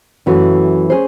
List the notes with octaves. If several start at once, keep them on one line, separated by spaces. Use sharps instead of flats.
F#2 E3 A3 C#4 F#4
C#4 G#4 C5